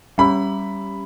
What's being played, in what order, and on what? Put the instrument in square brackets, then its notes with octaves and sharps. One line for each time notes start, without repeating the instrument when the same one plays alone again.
[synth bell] G3 C#4 G4 [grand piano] B5